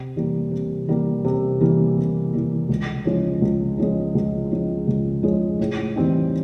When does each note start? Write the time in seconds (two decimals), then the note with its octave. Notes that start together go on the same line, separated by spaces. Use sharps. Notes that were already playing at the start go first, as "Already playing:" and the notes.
Already playing: C3
0.16 E3 G3 A#3
0.51 C3
0.88 E3 G3 A#3
1.24 C3
1.61 E3 G3 A#3
1.97 C3
2.33 E3 G3 A#3
2.69 C#2
3.05 C#3 F3 G#3
3.42 C#2
3.78 C#3 F3 G#3
4.15 C#2
4.51 C#3 F3 G#3
4.87 C#2
5.23 C#3 F3 G#3
5.59 A2
5.96 E3 G3 C4 D#4